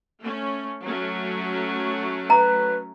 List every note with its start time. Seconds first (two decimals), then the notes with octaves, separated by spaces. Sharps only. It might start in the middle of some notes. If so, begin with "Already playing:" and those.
0.23 A3 C#4
0.85 F#3 A3 C#4
2.30 B4 A#5